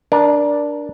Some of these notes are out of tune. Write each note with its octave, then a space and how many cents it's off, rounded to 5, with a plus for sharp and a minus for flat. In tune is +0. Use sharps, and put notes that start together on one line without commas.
D4 +0 A#4 +25